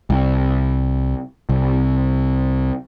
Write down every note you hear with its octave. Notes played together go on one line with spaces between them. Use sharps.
C2
C2